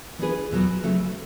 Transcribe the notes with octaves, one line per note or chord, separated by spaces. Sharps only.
E3 B3 D4 G#4 B4
E2 B2 F#3 B3
C#3 F#3 A3 C#4